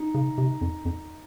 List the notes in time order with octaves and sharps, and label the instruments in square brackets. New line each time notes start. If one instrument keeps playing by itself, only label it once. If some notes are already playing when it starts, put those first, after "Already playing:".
Already playing: [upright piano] D#4
[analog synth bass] C#3
C3
F2
F2